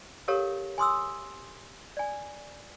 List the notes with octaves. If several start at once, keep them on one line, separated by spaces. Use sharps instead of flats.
G4 A4 A#4 C#5 F5
G#5 C6 D#6 E6
D5 G#5